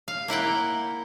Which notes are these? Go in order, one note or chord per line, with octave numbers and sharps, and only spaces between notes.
F5
A#3 E4 F#5 G5